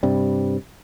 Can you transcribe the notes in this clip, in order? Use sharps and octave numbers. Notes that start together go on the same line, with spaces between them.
G2 C3 G3